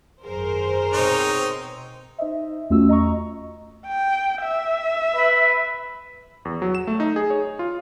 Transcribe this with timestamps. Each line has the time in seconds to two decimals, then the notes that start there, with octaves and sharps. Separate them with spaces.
0.25 G#1 F#2 G#4 A#4 C5
0.93 B2 C4 D#4 C#5
2.18 D#4 C5 D#5 E5
2.70 E2 A3 C#4 F4 F#4 E6
2.89 D#5 A#5 C#6
3.87 G5
4.42 E5
5.16 B4
6.45 E2
6.62 F#3
6.75 E7
6.87 A3
7.00 D#4
7.16 G#4
7.30 C#5
7.59 F4